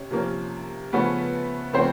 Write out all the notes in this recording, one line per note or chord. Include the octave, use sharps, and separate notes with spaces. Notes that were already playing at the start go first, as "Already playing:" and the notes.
Already playing: C3 C#4
C3 F3 A#3 C#4
C#3 F3 A3 B3 C#4 B4
C#3 F3 A3 C4 C#4 C5